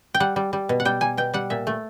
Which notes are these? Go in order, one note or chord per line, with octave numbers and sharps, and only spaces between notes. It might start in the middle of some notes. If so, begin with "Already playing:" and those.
G5
G3 F#5
G3
G3
B2
F#5
G3 G5
G3 G#5
B2 G5
G3 F#5
A#2 E5
A3